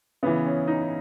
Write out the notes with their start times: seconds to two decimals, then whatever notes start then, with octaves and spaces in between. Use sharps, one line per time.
0.23 C#3 E3 B3
0.45 C#4
0.67 D#4